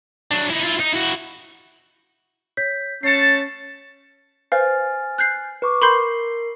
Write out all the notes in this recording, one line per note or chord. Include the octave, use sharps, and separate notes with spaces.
F#3 D4
D#4 E4
E4 F4
D#4
E4 F#4
C#5 G6 B6
A3 C#4 A5 C7 C#7
B4 C5 F5 G#5 F6 A6
F#6 G6 C7
B4 C#6 D6
A#4 B5 C6 G6 C7